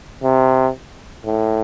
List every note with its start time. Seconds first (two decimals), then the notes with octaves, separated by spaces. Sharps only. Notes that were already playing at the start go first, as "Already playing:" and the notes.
0.23 C3
1.26 A2